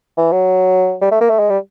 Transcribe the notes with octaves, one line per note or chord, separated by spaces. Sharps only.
E3
F#3
G3
A3
A#3
A3
G#3
G3